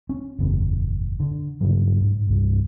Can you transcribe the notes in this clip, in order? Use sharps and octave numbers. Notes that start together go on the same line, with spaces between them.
C#4
F#1 E2 A2
D3
G2 A#2 C#3 F#3
G#2
C2 G2